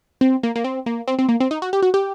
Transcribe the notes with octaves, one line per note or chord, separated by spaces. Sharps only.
C4
A#3
A#3
C4
A#3
C4
C4
A#3
C4
D#4
F#4
G4
F#4
G4